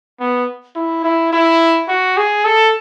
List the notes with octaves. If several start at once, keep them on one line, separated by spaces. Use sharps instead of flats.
B3
E4
E4
E4
F#4
G#4
A4